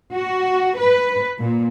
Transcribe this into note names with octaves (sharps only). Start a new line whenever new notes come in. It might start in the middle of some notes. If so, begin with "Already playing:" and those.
F#4
B4
A#2